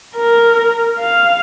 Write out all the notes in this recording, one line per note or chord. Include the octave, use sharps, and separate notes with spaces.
A#4
F5